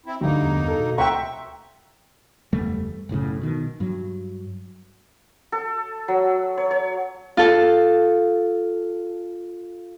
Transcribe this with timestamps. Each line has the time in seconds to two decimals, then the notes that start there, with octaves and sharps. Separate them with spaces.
0.06 C4 E4
0.21 D2 G2 A#3 D#4
0.42 E2
0.68 A4
0.80 B2
0.98 D2 E5 F#5 G5 A#5 C6 C#6 E6
2.53 F#1 E2 G3 A3
3.09 F#1 B1 A2 C#3
3.42 B2 D#3
3.80 G2 F#3
5.52 A4
6.08 F#3
6.58 C#5
6.71 C#5
7.37 F4 A4